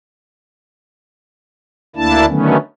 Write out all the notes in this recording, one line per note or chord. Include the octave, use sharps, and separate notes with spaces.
D2 A#3 D4 E4 A5
D3 D#3 F#3 A3 B3 C#4